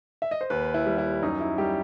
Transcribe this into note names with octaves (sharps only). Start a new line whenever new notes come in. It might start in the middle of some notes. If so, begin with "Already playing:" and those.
E5
D#5
C5
D#2 B4
E4
G3
E4
F#2 D#4
E4
G3 G4